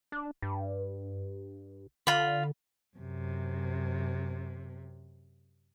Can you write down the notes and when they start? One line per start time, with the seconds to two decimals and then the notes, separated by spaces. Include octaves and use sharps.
0.12 D4
0.42 G2
2.07 D3 F4 B5
2.97 F#2 C3